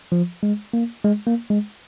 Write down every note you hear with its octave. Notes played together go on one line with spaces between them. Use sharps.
F3
G#3
A#3
G#3
A#3
G#3